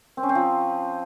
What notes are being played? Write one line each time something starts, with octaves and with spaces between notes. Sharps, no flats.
C4
C#4
C4
F3